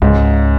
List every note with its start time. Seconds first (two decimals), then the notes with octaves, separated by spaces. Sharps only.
0.02 C#2 G#2 C#3